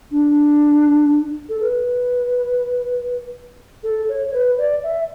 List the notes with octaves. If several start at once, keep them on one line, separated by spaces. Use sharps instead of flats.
D4
A4
B4
A4
C#5
C#5
B4
D5
E5